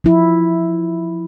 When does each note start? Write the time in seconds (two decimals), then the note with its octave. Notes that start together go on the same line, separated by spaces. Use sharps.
0.04 F3 E4